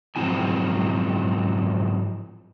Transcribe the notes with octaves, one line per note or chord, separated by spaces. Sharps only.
G#2 F3 F#3 C4 E4 G#5